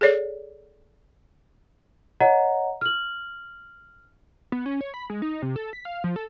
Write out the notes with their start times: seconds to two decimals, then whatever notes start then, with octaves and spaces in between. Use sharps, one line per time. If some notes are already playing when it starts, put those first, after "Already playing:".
0.01 G#4 A4 C#5 D5
2.20 C#5 D#5 F#5 A#5
2.81 F6 F#7
4.52 B3
4.66 C#4
4.81 C#5
4.94 B5
5.10 G#3
5.22 D#4
5.42 C3
5.56 A4
5.73 B6
5.85 F5
6.04 F3
6.16 A4